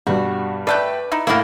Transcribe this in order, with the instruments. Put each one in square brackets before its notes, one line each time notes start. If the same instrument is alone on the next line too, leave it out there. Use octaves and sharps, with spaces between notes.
[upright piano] G2 B2 G3 [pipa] F#4
[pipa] B2 A3 G5 [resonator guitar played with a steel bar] B4 [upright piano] D5 F#6
[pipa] D#4 E4
[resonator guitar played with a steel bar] A2 A#3 [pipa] E4 F#4 F5